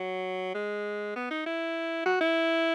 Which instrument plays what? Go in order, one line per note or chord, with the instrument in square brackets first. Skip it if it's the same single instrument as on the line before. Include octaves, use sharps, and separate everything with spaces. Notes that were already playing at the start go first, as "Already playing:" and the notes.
Already playing: [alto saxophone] F#3
G#3
B3
D#4
E4
F#4
E4